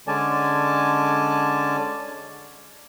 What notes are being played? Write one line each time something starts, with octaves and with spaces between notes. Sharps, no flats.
D3 G#3 C#4 D5 G#5 A5